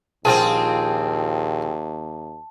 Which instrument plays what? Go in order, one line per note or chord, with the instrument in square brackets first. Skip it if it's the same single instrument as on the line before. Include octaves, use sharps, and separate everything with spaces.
[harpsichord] A#1 [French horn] D#2 [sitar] C4 F4 G#4 [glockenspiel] A5